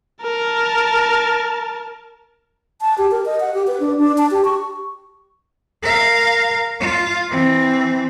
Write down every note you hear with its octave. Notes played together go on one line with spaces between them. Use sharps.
A#4 A5
A5
G4
A#4
D#5
F#5
G4
B4
D4
D4
A5
G4
C#6
A#4 F5
F4
E3 C4